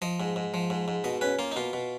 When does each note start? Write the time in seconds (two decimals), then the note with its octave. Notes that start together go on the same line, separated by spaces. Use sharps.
0.02 F3 D#5
0.20 G#2
0.36 G#2
0.54 F3
0.70 G#2
0.88 G#2
1.04 B2 D#5
1.21 C#4 B4
1.39 A#3 F4
1.52 D#4
1.56 B2 F4
1.73 B2